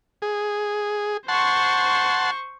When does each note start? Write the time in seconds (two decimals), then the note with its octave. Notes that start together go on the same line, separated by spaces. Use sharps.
0.22 G#4
1.28 C5 F#5 A5 C6 C#6